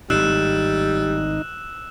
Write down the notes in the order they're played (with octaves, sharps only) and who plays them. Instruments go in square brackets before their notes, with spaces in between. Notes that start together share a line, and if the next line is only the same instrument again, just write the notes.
[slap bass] G#1 A2 [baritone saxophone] G3 [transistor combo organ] D#4 [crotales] E6 F#6 E7